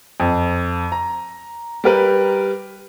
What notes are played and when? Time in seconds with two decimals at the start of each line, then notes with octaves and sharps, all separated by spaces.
0.20 F2
0.92 A#5
1.84 G3 G4 A#4 B4